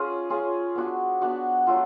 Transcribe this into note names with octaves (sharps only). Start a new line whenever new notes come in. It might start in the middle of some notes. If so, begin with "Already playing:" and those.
Already playing: C#4 F4 G#4
C#4 F4 G#4
B3 D4 F#4
B3 D4 F#4
F#3 A3 F4